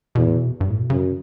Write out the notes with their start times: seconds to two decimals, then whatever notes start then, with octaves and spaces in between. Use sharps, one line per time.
0.15 E2 B2
0.26 A2
0.35 B2
0.61 G2
0.70 A2
0.80 B2
0.90 F#2 C#3